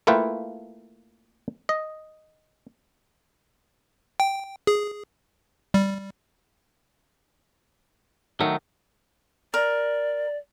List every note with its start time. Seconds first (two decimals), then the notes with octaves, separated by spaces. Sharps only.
0.07 A3 A#3 E4 F4 B4 G5
1.69 D#5
4.20 G5
4.67 G#4
5.74 G3
8.40 D#3 F#3 A3
9.54 A#4 D5